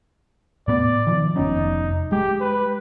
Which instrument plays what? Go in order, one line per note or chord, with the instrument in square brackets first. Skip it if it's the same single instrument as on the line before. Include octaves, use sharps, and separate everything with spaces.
[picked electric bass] A2 B3 [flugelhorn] D5
[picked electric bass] D#3 F3
[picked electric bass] F1 B3 C#4 [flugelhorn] D#4
[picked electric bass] G#3 [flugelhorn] G4
[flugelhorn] B4